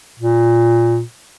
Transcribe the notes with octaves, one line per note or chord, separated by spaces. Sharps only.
A#2